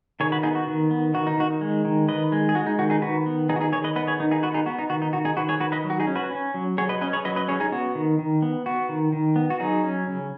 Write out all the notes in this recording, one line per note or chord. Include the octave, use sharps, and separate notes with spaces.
D#3 G#4 C#5
F#4 B4
B3 D#4 G#4
F#4
D#3
B3
D#3 F#4
D#4
D#3 F#4
G#3
D#3
D#3 B4 D#5
G#3
G#4
G#3 F#4
D#4
D#3 F#4
D#4 G#4
D#3 F#4 B4
B3
D#3 D#4 G#4
F#4
D#4 G#4
D#3 G#4 C#5
B4 D#5
B3 B4 D#5
G#4 C#5
D#3 D#4
D#4 G#4
B3 F#4 B4
D#4 G#4
B3 F#4
D#4
D#3 F#4
D#4
D#3 F#4
D#4 G#4
D#3 F#4 B4
G#4 C#5
D#3 F#4 B4
B4 D#5
F#3
F#4
D#4 G#4
C#4
F#4 B4
C#4
F#3
F#3 G#4 C#5
B4 D#5
C#4 B4 D#5
G#4 C#5
F#3 B4 D#5
B4 D#5
C#4 G#4 C#5
D#4 G#4
B3 F#4
D#3
D#3
B3
B3 F#4
D#3
D#3
B3
F#4
F#3 D#4 G#4
C#4
C#3